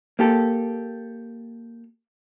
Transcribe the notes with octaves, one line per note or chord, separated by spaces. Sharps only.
A#3 G4 A4